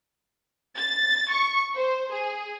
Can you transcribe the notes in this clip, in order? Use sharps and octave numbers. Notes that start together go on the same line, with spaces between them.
A6
C#6
C5
G#4